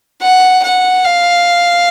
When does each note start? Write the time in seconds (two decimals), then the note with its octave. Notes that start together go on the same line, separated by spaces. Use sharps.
0.22 F#5
0.63 F#5
1.05 F5